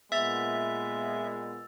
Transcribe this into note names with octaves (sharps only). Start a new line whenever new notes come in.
A#2 G#3 B3 E5 E6 A6 F7